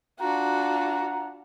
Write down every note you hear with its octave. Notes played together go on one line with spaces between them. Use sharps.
D4 F4 F#4 F#5 A#5